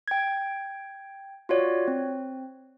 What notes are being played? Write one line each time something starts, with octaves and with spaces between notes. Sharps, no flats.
G5 G#6
F4 F#4 C#5 D5
C4